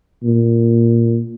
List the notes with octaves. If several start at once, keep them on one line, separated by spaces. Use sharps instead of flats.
A#2